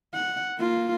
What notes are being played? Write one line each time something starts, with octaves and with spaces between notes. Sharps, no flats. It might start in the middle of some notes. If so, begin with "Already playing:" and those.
F#5
A#3 F4